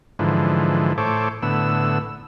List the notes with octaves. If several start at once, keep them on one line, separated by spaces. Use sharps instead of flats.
G#2 D3 E3 F3
A2 A4 C5 C#5 D6
A2 D3 B3 E6